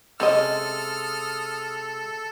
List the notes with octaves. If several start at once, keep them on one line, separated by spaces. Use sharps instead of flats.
C3 G#3 C4 C#4 A4 D#5 D#6 F6